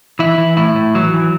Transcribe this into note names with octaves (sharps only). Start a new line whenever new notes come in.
E3 E4
E3
A2 E4
A2
E3 F#3
E3